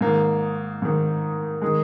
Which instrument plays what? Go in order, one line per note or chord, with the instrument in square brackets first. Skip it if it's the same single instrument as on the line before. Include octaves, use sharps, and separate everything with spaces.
[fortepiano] G#2 D#3 A#3
G#2 D#3
D#3 G#3